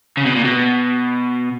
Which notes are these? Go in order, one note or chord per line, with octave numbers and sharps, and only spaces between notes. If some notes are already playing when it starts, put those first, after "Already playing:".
C#3
B2
A#2
B2